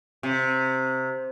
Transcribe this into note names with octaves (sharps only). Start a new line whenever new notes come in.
C3